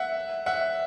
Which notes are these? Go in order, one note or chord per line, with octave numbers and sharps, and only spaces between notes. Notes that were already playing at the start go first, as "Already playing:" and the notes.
Already playing: E5 F#5
E5 F#5